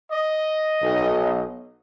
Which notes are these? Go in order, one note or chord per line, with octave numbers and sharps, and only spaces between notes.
D#5
B1